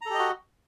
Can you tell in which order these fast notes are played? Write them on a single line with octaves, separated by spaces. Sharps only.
A#5 A4 G4 D#5 F#4